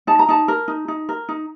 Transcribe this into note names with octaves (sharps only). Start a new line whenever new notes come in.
D#4 A5
A#5
D#4 A5
A#4
D#4
D#4
A#4
D#4